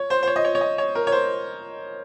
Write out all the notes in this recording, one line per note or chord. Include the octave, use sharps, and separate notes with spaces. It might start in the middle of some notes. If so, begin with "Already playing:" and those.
Already playing: C#5
C5
C5
C#5
D#5
C#5
C#5
D#5
C#5
A#4
C#5
C5